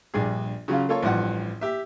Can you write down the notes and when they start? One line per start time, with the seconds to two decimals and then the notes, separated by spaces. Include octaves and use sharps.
0.14 A#1 G2 G#4
0.68 C#3 F#3 C#4 F4
0.89 A#3 F4 A4 C#5
1.03 A1 G2 F3 F#5
1.61 G4 E5